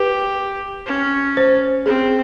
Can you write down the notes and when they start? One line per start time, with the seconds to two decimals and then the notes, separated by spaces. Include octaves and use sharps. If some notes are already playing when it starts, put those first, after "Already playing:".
Already playing: G4 B4
0.86 C#4
1.37 C5
1.86 C4 G#4